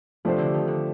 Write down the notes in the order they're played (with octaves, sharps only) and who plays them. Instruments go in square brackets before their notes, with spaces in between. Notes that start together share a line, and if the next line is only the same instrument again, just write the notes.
[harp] C3 [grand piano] F3 A3 D4 G4 C5
[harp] D3
D#3
D3